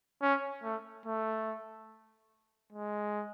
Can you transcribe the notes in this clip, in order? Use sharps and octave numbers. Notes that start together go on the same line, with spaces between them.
C#4
A3
A3
G#3